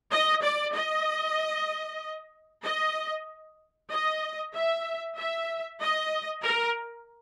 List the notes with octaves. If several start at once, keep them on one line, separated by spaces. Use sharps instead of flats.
D#5
D5
D#5
D#5
D#5
E5
E5
D#5
A#4